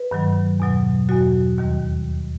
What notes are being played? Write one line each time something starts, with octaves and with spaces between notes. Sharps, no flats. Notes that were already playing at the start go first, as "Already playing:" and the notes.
Already playing: B4
G2 D#3 F#3
E2 B2 F#3
E2 B2 F#3 F#4
D#2 D#3 G3